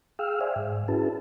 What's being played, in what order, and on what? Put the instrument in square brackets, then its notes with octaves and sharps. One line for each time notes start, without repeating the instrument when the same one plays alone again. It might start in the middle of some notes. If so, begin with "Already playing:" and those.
[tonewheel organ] G#4 F5 G5 E6 F6
C5 D5 E5 F5 G5 G#5
G#2
C#4 E4 F#4 G#4 B4 A5